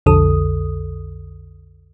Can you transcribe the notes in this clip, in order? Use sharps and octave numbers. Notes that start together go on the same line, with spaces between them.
B1 F2 D3 A4 D#6